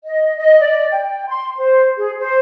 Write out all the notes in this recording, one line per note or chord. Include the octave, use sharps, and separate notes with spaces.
D#5
D#5
D5
G5
C6
C5
G#4
C5